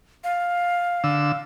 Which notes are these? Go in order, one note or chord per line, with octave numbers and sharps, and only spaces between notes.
F5
D3 E6